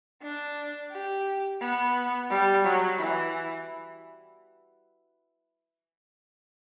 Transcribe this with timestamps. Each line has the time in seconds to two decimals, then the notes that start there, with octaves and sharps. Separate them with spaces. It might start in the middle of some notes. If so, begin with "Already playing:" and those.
0.22 D4
0.91 G4
1.60 B3
2.30 G3
2.64 F#3
2.99 E3